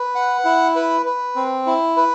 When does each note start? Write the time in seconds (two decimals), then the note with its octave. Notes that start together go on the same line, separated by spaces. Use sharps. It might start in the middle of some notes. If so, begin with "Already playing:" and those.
Already playing: B4
0.15 F#5
0.45 E4
0.76 B4
1.06 B4
1.36 C4
1.66 E4
1.97 B4